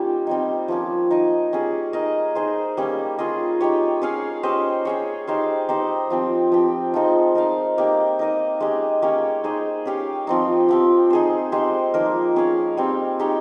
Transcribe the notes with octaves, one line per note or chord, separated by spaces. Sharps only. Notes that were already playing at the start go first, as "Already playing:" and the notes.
Already playing: G3 A#3 C#4 D#4 F4 G4
G3 C4 D#4
F3 A#3 C#4
D#4 A#4 D#5
G3 C#4 G#4
D#4 A#4 D#5
D#4 G#4 C5
G3 A#3 C#4
C#4 F4 G#4 D#5
D#4 G4 C#5
C#4 G#4 C#5 F5
C#4 G4 C5 D#5
C#4 G#4 C#5
D#4 G4 C5 F5
D#4 G4 C5 D#5
F3 C4 G4
F3 C4 G4
F3 G#3 C4 D#4
D#4 A#4 F5
A#3 D#4 G4
D#4 A#4 D#5
G#3 C#4 G4
A#3 C#4 G4 C#5
D#4 G#4 C5 D#5
C#4 G4 C#5 F5
F3 C4 D#4
F3 C4 G4
D#4 G#4 C5
G#3 D#4 G4 C5
F3 A#3 D#4 A#4
C#4 G#4 C#5 F5
G3 C4 D#4
G#3 D#4 G4 C#5